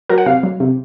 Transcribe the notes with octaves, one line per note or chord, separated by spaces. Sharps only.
F#3 A#4
F#5
C3 F5
F#3
C3